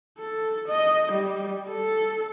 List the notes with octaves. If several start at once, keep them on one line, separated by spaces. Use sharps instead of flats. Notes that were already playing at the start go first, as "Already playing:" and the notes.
A4
D#5
G3
A4